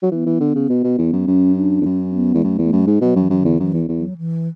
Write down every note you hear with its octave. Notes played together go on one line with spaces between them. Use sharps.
F#3
E3 B3
E3
D3
C#3
B2
B2
E2
F#2
F#2 C#4
D4
E2
F#2 C#4
B3
E2 G#3
F#2 A3
E2 A3
F#2
G#2 G#3
B2 F#3
F#2
E3
F#2
E2 D3
F#2 E3
E2
E2
F#3
E3